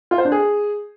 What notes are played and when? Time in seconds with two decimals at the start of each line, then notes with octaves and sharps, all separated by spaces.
0.11 F4
0.18 C5
0.25 D4
0.32 G#4